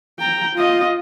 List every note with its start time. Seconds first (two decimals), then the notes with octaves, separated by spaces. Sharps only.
0.20 G5 A#5
0.56 F4 D#5